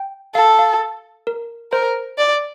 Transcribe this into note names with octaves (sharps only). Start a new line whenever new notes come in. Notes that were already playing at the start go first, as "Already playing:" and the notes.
Already playing: G5
A4 F5
F5
A#4
A#4 C5
D5